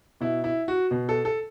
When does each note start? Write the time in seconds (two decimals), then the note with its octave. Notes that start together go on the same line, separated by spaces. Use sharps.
0.21 B2 E4
0.44 E4
0.68 F#4
0.91 B2
1.09 A4
1.25 A4